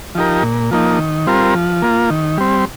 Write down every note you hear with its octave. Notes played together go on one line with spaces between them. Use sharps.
F3 D#4 G4 A#4
A#2
F3 A#3 D#4
D#3
G3 C4 F4 A#4
F3
A#3 F4
D#3
G3 C4